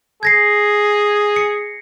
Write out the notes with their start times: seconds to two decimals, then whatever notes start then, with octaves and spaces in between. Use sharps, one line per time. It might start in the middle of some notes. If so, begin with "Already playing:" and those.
0.23 G#4 G#6 A#6 C7
1.36 C#7